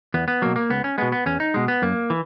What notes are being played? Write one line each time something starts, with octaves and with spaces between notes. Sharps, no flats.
E2 B3
B3
B2 F#3 A#3
A#3
C#2 B3
C#4
B2 G#3 B3
B3
E2 C#4
D#4
B2 G#3
B3
F#2 A#3
E3